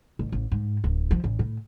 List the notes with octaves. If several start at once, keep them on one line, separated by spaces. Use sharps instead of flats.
A1
A1
G#2
D1
F3
A1
A2